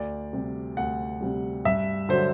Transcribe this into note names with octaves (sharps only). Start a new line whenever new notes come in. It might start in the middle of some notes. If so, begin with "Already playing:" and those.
Already playing: D2 D5
C3 G3
D2 F#5
C3 G3
G2 E5
D3 F#3 C5